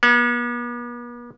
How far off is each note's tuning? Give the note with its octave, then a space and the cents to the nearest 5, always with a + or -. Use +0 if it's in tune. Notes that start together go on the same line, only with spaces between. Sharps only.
B3 -45